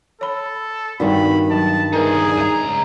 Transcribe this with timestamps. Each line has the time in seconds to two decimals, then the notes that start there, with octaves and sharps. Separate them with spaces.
0.21 A4 C#5 B5
1.00 G2 D#3 C4 D#4 F#4 D5 B5
1.51 F#3 A5
1.93 G3 D#4 G#4 A#4 B4
2.38 C#2 A#5